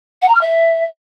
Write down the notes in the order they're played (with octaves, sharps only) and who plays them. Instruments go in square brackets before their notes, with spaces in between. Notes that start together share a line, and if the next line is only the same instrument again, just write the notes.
[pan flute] F#5
A#5
F6
E5